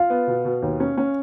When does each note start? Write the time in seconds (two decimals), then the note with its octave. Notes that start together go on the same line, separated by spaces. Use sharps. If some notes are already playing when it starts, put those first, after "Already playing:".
Already playing: F4 F5
0.10 B3
0.27 B2
0.45 B2
0.62 D#2
0.80 C#4
0.97 C#4